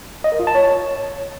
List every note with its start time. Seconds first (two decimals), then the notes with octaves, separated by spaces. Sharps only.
0.24 D#5
0.32 A#4
0.40 F4
0.47 A5
0.55 C#5